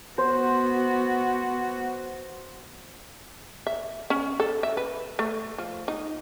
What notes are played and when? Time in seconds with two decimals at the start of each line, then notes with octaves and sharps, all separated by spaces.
0.18 B3 F#4 C5
3.67 E5
4.10 C#4
4.40 A4
4.63 E5
4.77 B4
5.19 A3
5.58 F3
5.88 D#4